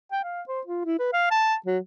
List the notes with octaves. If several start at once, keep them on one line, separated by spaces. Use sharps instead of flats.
G5
F5
C5
F4
E4
B4
F5
A5
F#3